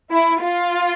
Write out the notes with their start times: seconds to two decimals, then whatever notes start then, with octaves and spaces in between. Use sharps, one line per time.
0.11 E4
0.41 F4